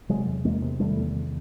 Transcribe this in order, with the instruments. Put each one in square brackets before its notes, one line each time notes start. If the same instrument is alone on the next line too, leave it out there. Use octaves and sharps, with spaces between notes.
[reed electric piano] C3 [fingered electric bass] F#3 G#3
[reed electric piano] E2
[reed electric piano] E2 [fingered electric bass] G#3 A#3
[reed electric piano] C3
[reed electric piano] D#3 [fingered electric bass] G3 A3
[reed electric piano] E2